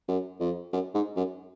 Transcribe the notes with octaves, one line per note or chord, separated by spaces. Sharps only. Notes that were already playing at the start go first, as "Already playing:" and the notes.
F#2
F2
F#2
G#2
F#2